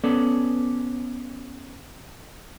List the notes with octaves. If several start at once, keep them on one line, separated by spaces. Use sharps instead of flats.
B3 C#4 A4 D5